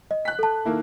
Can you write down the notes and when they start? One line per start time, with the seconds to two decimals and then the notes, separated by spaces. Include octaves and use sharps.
0.11 D#5
0.25 F#6 B6
0.39 A4 A5
0.65 D#3 A#3 E4